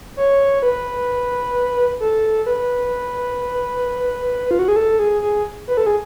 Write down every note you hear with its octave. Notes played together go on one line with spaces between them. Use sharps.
C#5
B4
A4
B4
F4
F#4
G#4
A4
G#4
G#4
B4
A4
G#4